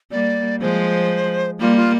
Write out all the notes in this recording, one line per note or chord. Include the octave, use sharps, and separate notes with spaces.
G3 A#3 D5
F3 G#3 C5
G3 A#3 F4
F4